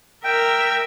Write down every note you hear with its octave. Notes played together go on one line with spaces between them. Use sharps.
A#4 E5 G5